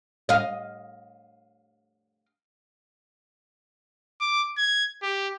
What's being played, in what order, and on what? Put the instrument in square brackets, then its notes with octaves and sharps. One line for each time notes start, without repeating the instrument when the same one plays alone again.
[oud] D#5 F5
[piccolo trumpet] D6
G#6
G4